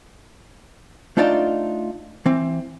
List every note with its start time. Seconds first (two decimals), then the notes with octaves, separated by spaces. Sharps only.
1.17 A3 D4 D#4 F4 D5 A5
2.26 E3 C4